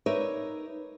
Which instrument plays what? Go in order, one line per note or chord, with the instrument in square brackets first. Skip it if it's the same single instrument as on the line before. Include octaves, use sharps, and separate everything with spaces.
[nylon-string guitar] D#4 A#4 B4 C#5 D5 E5